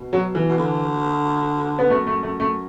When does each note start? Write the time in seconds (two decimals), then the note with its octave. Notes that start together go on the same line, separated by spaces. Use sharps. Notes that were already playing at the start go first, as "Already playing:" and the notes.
Already playing: B2
0.13 F#3
0.35 E3
0.49 B2
0.58 D3
1.79 B3
1.90 F#2 A3
2.07 A3
2.23 A3
2.40 A3